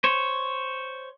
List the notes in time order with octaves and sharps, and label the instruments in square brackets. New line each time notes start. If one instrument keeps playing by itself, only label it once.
[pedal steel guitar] C5 C#5